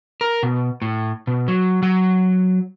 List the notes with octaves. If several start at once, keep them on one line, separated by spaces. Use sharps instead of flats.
A#4
B2
A2
B2
F#3
F#3